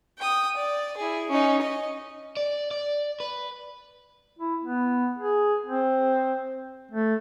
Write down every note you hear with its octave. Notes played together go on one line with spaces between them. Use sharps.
G5 D#6
D5
E4 G#4
C#4 D#4
D#5
D5
D5
B4
E4
B3
G#4
C4
A3